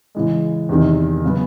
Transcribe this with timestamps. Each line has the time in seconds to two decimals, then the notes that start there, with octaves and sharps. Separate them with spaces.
0.15 C#3 E3 G#3
0.69 E2 C3 D#3
1.25 C#3 F#3 B3